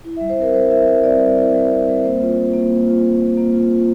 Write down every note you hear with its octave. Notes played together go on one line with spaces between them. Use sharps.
E4
E5
G3
C5
C4 A#4
G3 C5
E4 E5
G3 E5
C4 D5
G3
E4
G3
C4
G3
A#3 C5
F4
F4
A#3
A#3
F4
F4
A#3
A#3
F4
F4